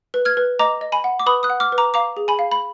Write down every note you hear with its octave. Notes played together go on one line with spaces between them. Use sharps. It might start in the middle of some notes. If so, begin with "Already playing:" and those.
B4
F6 G#6
B4
D#5 A#5 D6
D#5
G#5 B5
F#5
D6
B4 B5 D#6
D#6 F#6
F#5
D6 F6
B4
A#5 D6
F5 A#5 D6
G#4
G#5 B5
F5
B5